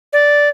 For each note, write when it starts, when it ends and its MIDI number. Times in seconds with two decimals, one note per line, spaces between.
0.13 0.49 74